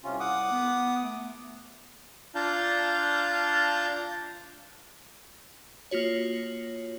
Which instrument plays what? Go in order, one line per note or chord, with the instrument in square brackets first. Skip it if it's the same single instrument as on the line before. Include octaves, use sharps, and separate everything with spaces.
[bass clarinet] C2 [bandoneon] C3 C#4 F4
[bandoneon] F#5 D6 D#6
[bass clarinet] B3
A3
[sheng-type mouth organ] D4 F4 F5 A5 A#5 G6
[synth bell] A#3 F4 F#4 C#5